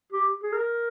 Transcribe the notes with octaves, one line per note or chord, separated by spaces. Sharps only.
G4
G#4
A#4